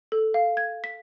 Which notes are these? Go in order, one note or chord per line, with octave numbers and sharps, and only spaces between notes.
A4
F5
G#6
B6